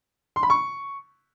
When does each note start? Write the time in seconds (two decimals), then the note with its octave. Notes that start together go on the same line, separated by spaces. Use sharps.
0.36 C6
0.43 B5
0.50 C#6